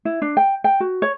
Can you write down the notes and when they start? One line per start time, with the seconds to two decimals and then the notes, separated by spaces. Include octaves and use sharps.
0.05 E4
0.22 D4
0.37 G5
0.64 G5
0.80 F#4
1.02 C#5